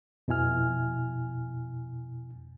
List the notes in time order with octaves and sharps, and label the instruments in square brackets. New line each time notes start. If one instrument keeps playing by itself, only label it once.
[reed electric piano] F2 B2 E4 G#5 F6